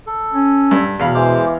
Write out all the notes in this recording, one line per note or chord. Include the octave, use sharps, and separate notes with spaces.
A4
C#4
G2
E2 B2 F5 B5
E3 G#3 C5 D6